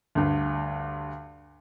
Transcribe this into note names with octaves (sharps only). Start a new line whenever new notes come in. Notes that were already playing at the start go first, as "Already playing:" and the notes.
D2 G2